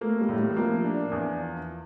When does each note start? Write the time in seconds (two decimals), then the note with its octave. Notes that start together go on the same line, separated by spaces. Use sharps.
0.01 A3 A#3
0.20 G3
0.29 A2
0.38 G3
0.56 F3 A#3
0.84 D4
1.11 E2